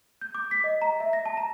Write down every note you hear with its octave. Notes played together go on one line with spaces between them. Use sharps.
G6
D6
B6
D#5
A#5
E5
A#6
A5
A#5